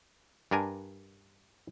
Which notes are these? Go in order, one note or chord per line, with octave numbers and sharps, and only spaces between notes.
G2 D4 A#4 G#5 A#5